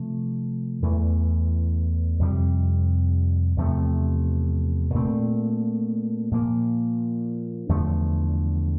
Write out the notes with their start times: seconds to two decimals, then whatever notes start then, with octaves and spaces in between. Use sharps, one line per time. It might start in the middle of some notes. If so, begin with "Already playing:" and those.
Already playing: C3 F3 A3 C4
0.82 E2 E3 A3
2.19 F2 C3 G3
3.57 E2 C3 F3 A3
4.94 A#2 A3 C4
6.31 A#2 F3 A#3
7.69 E2 D3 F3 A3